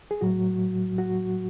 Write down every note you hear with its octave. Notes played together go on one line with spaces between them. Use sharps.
G#4
A2 F#3 F#4
F#4